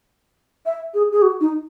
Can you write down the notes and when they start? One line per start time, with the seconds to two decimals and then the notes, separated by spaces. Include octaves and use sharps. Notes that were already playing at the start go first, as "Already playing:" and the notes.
0.66 E5
0.94 G#4
1.12 G#4
1.22 F#4
1.41 D#4